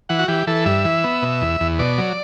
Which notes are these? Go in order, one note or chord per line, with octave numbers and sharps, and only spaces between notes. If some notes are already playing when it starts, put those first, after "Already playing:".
E3 F#5
F#4
E3 G4
E3 A4
G2 E5
E3
B3
B2
E2
E2
B2 D5
F#3